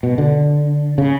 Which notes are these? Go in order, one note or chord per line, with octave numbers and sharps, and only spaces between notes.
B2
D3
C#3